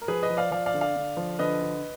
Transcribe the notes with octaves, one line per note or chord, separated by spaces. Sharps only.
A#4
F3 G#4 B4
B4 D#5
F3
D5 F5
F3 D5 F5
D5 F5
D3
D5 F5
D3
F3
D3 B4 D#5
D3